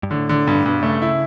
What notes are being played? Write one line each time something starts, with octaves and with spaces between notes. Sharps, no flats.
G2
A2 D3
D3
G2 B2
A2
G2 B2
C#3 A3
E4